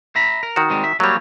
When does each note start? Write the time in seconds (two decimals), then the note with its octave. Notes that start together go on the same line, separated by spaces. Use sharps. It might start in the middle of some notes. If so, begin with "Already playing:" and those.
0.16 E5 A#5 B5
0.43 A#4
0.56 D#3 F#4
0.70 G3 G#3 C4
0.84 E5
1.00 F#3 G3 A#3 C#5